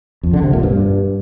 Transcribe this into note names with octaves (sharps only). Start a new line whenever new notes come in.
F2
D3
C3
A#2
G2